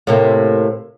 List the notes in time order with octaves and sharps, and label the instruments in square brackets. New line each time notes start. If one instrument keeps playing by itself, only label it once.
[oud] A2 C3 A#3